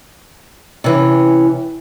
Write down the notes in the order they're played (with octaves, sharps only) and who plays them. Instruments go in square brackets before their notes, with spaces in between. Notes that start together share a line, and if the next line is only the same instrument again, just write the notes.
[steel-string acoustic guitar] C3 E3 C#4